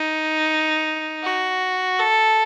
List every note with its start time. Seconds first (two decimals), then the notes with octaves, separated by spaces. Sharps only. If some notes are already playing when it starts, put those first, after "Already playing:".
Already playing: D#4
1.22 F#4
1.99 A4